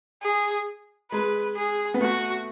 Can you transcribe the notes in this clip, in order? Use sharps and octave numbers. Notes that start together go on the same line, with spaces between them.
G#4
G#3 B4
G#4
B3
A3 F#4